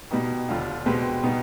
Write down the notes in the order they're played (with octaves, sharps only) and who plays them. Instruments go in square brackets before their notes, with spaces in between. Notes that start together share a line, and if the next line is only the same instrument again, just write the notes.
[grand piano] B2 G3 B3 D#4 G4
D#2 D3 G3 D4 F4
B2 G#3 C4 G4 B4
B2 G3 B3 D#4